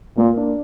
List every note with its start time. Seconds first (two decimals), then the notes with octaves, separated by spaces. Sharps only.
0.17 A#2 A#3
0.37 D4